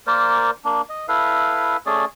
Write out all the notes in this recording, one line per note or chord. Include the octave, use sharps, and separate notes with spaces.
A#3 A#4 C5 D5
A#3 D4
D#5
E4 A4 B4 F5
A3 C#4 G#4 D5